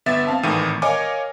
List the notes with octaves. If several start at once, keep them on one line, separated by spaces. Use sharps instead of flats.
G1 B3 E5 A6
C4 F5 A5
G#1 A2 D#3 E3 D#7
A#4 C#5 D#5 F5 G#5 D6